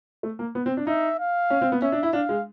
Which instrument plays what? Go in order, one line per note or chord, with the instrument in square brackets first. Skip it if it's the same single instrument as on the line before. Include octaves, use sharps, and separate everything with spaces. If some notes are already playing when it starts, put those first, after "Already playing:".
[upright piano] A3
A#3
B3
C4
D4
[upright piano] D#4 [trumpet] E5
[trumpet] F5
[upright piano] C#4
C4
B3
[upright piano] C#4 [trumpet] E5
[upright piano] D4
E4
[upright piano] D4 [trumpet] F5
[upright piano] G#3